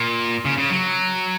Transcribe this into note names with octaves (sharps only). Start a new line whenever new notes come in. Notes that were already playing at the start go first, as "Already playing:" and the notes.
Already playing: A#2
C#3
C#3
F#3